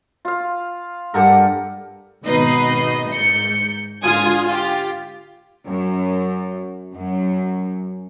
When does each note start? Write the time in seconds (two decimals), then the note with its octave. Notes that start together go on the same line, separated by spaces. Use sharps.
0.25 F4 F5
1.14 G2 G4 A4 A#4 F#5
2.25 G#1 B2 D#4 B4 D#5 C7
3.11 G#2 G6 C#7
4.03 G#2 D3 F4 G#5 D#6
4.46 F4 G4
5.67 F#2
6.95 F#2